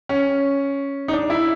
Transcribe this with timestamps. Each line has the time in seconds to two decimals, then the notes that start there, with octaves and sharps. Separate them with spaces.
0.09 C#4
1.08 D#4
1.13 D4
1.30 E4